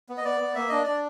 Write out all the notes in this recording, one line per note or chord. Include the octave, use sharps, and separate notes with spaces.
B3
D#5
B3 D5
B3
A#3 E5
D4 D#5
D4 D5